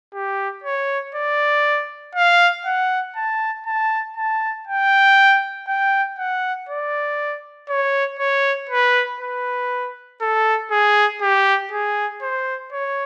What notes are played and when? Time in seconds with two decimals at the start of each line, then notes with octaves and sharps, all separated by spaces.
0.14 G4
0.64 C#5
1.15 D5
2.15 F5
2.66 F#5
3.16 A5
3.66 A5
4.17 A5
4.67 G5
5.67 G5
6.18 F#5
6.69 D5
7.69 C#5
8.19 C#5
8.70 B4
9.21 B4
10.21 A4
10.71 G#4
11.22 G4
11.72 G#4
12.22 C5
12.73 C#5